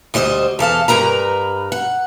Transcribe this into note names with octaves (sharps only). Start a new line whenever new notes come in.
D2 G3 C5 D5 D#5
E2 A4 F5 A5
G2 C#3 A#4 B4 A#5
F#5